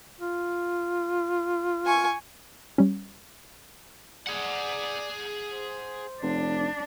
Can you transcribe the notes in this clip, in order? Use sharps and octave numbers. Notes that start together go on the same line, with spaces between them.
F4
G#5 C#6
G3 C#4
G#4 D5 F#5
C5
F1 D4